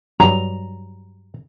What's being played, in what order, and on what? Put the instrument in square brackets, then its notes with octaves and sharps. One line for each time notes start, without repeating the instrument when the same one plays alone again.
[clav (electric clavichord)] G2 F#3 G3 [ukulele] A#5